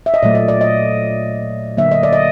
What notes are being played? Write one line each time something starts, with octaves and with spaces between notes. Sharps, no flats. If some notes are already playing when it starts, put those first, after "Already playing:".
E5
D#5
A#2 F#3 A3 D5
D#5
D5
D#5
D3 F#3 A#3 E5
D#5
D5
D#5